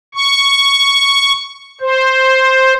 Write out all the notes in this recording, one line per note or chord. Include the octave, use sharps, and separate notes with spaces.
C#6
C5